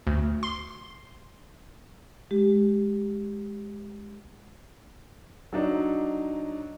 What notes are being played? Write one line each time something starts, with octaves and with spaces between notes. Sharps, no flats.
D2
C6
G#3 G4
F#3 D4 D#4